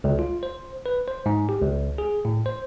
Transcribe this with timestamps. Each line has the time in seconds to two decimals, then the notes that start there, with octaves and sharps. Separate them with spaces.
0.04 C#2
0.19 F4
0.43 C5
0.86 B4
1.08 C5
1.26 G#2
1.49 G4
1.61 C#2
1.98 G#4
2.25 A2
2.46 C5